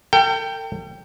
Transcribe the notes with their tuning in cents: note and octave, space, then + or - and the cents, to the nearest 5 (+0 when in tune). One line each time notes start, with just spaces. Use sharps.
A4 +45 G5 +0